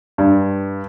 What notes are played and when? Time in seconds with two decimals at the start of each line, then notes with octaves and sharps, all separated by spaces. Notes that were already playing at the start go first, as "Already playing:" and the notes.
0.18 G2